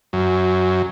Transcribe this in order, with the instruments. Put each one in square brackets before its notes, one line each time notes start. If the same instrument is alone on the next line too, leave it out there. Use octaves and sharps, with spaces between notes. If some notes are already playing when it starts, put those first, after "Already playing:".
[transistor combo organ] F#2